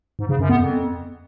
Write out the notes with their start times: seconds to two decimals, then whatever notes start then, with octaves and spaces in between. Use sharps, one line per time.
0.19 G#2
0.29 C#3
0.39 F#2
0.49 B3
0.59 F2